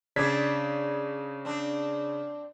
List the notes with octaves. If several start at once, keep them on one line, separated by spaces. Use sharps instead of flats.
C#3 C4 D4 D5 G#6 B6
C4 D4